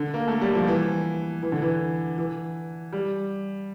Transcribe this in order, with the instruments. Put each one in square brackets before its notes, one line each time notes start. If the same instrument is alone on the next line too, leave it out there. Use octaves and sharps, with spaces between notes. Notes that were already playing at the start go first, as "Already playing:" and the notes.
Already playing: [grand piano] D3
A#3
A3
G3
F3
E3
E3
D3
E3
E3
G3